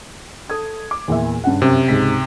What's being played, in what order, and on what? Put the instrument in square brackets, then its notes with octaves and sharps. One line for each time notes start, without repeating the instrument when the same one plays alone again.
[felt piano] A4 D#6 G#6
D6
E2 A#2 E5
G2 C#3 F#5
[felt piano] F#2 [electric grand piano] C3
[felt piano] C#2 G#2 B6